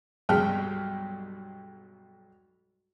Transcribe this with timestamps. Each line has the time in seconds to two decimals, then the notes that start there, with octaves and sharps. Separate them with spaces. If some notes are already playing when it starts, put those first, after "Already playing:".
0.29 B1 G2 G3 G#3 G5 F6